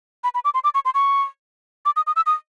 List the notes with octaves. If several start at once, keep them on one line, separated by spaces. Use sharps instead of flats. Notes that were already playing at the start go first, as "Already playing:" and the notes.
B5
B5
D6
C6
D6
C#6
C6
C#6
D6
D#6
D#6
E6
D#6